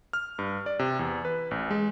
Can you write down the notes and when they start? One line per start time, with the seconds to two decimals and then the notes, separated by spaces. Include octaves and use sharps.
0.13 F6
0.39 G2
0.66 D5
0.79 C3
0.99 E2
1.25 B4
1.51 A1
1.71 G#3